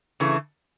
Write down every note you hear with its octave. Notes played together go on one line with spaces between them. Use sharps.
C#3 E3 A3